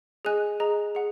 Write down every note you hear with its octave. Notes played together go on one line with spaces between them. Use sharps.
G#4 D#5 G#5 F#6
G#4 D#5 A#5
G#4 F#5